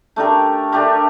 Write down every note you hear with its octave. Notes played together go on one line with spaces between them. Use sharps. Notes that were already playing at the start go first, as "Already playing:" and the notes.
A3 D4 G4 A#4
A3 D4 G4 A#4